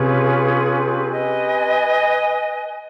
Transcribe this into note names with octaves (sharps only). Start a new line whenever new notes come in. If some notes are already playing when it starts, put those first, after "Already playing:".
Already playing: C3 C#4 F4 G#4 B4
B4 D#5 G#5